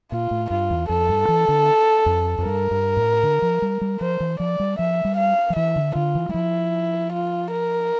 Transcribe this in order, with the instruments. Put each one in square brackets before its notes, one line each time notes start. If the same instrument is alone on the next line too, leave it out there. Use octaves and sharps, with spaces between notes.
[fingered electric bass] A#2 [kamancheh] F4
[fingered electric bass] A2
[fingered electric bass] G2 [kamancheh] F4
[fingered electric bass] E2
[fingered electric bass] F2 [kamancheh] A4
[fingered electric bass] G2
E3
D3
F2
F2
[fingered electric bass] G2 [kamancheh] A#4
[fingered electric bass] G2
A2
D3
F3
G3
G3
[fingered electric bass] F3 [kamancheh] C5
[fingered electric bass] E3
[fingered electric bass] F3 [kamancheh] D5
[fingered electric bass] G3
[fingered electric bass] F3 [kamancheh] E5
[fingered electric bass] G3
[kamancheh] F5
[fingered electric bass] F3
[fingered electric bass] E3 [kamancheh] E5
[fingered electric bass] D3
[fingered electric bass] D3 [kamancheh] F4
[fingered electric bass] E3
G3
[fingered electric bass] F3 [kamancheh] E4
[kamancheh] F4
A#4